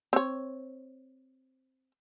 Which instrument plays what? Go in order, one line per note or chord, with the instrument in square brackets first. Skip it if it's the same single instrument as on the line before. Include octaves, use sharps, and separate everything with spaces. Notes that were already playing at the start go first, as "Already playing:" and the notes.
[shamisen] C4 C#5